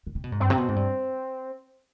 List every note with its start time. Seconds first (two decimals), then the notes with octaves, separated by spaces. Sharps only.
0.07 D3
0.15 C3
0.24 B2
0.32 G#2
0.40 G2 C4
0.50 C3
0.58 B2
0.68 G#2
0.76 G2